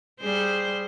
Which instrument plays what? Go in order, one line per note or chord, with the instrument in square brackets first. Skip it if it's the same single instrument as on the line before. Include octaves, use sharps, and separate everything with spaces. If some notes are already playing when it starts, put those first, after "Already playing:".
[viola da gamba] G3 G#4 C5